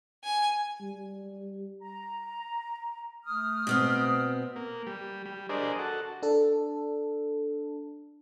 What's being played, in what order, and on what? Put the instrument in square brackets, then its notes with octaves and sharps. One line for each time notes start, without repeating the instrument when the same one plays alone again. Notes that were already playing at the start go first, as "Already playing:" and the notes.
[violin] G#5
[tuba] G3
[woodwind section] A#5
A3 D#6 F6
[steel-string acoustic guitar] B2 B3 C4
[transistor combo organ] A#3
G3
G3
D4 G#4 A#4 C5 D5 D#5
F#4 A4
[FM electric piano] D4 A4